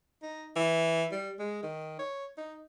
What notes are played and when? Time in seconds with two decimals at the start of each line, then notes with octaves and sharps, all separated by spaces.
0.22 D#4
0.56 E3
1.12 G3
1.39 G#3
1.63 D#3
1.99 C#5
2.38 D#4